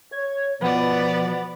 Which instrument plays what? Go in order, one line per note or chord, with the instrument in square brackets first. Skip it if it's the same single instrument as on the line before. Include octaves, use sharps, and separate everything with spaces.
[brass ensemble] C#5 [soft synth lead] G#6
[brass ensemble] B2 [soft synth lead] F3 [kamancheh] B3 D5